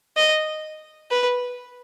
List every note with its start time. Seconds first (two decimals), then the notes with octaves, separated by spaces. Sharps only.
0.17 D#5
1.11 B4